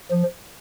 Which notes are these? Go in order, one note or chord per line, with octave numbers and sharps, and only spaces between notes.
F3